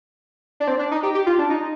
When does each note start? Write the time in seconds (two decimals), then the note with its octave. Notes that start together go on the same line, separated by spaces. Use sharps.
0.60 D4
0.68 C4
0.79 D4
0.91 D#4
1.03 G4
1.15 G4
1.26 F4
1.38 D4
1.50 D#4